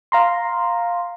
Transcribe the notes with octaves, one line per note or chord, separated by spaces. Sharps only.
F5 A#5 C6